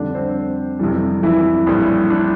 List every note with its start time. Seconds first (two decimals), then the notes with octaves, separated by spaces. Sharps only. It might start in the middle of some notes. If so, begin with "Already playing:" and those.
Already playing: F2 D3 G3 D4 D5
0.15 C4 C5
0.79 F2 C3 E3 G3
1.23 E3 E4
1.66 A#1 A2 G3
2.10 D4